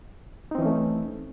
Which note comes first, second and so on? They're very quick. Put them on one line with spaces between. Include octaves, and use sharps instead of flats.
D#4 C4 E3 C#4 A3